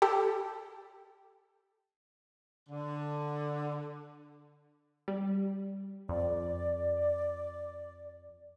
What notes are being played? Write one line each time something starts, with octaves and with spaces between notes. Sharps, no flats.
G4 A4
D3
G3
F2 D5